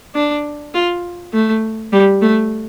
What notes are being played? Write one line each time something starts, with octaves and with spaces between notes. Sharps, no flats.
D4
F4
A3
G3
A3